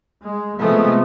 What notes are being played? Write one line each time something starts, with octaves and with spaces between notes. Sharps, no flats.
G#3
C3 F3 G#3 A3 B3